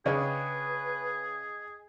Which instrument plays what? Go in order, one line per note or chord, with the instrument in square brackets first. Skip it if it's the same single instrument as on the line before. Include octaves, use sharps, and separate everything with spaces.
[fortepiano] C#3 C#4 D4 [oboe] G#4 [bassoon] B4 [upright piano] D#5 G5